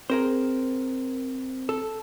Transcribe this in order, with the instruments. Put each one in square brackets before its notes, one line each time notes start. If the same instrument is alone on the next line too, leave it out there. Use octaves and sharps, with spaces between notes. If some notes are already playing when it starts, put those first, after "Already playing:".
[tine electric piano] C4 [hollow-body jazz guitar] G#4 A#4 C5
[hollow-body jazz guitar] A4